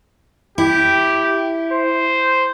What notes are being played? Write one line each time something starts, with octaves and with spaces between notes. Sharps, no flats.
E4 G4
C5